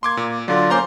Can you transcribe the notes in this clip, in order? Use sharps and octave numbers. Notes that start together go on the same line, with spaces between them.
A#3 C6 D6 G#6
A#2
D3 F#3 F4 D5
A#3 C#4 C5 A#5 C6 D6